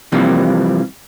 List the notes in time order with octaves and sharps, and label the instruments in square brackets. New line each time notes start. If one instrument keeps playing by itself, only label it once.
[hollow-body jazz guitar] C3 E3 F3 G3 A#3 C4